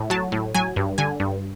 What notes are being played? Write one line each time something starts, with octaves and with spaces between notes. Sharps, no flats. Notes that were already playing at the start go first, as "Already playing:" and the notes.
Already playing: A2
F#3 A5
A2
F#3 G#5
G2
D3 G#5
G2